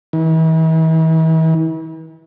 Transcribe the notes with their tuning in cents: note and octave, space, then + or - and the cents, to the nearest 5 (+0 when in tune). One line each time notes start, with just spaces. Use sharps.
E3 -40